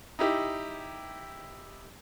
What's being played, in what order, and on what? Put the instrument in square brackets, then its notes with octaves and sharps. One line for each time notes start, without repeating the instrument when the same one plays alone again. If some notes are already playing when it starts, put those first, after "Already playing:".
[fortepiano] D#4 E4 G4